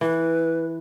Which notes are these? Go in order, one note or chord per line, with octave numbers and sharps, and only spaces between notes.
E3 B4